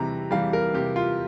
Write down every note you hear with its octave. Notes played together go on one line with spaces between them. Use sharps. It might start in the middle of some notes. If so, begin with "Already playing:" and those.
Already playing: C3 E3 G3 A#5
E3 G3 F5
A#4
C3 G4
F4